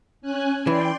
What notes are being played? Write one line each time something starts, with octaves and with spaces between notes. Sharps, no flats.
C#4 G#5 F#6
E3 D5 G5 C6